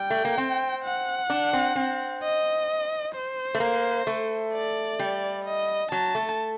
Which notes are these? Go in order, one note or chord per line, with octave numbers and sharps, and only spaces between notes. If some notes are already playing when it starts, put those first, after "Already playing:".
Already playing: G3 G5
A3
A#3
C4
F#5
D4
C4
C4
D#5
C5
A3
A#3
A3
D5
G3
D#5
F#3 A5
A3